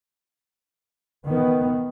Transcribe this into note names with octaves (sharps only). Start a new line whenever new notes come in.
D#3 B3